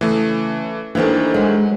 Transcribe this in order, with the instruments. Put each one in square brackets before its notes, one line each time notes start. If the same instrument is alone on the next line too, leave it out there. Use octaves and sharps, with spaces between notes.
[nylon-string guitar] C#3 [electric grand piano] E3 A3
[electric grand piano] D#3 E3 [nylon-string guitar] A#3 G4 A4 [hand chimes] D4 B4 C5
[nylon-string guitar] F#3 [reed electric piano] G#3